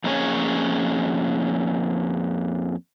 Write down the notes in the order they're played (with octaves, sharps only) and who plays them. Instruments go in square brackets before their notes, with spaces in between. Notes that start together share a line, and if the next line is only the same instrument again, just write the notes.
[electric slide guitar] F2 A#3 C#4 G#4 C#5